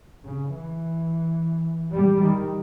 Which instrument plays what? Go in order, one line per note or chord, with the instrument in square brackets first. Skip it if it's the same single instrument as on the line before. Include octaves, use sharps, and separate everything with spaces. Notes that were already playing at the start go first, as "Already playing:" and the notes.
[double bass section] C#3
E3
G3
D#3